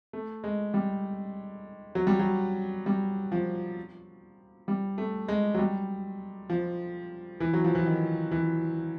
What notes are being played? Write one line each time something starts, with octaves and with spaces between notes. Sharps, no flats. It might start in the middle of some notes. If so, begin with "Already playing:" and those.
A3
G#3
G3
F#3
G3
F#3
G3
F3
G3
A3
G#3
F#3
G3
F3
E3
F#3
F3
E3
D#3
E3